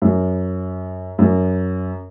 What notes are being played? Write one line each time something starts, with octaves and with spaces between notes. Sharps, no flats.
F#2
F#2